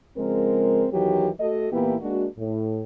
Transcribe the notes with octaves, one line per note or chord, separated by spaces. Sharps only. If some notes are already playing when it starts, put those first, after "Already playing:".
C#3 F3 G#3 C4 A#4
E2 D#3 E3 F#3 G4
A3 F#4 A4 D#5
A#2 E3 A#3 B3 E4 G4
G#3 A#3 D4 F#4
A2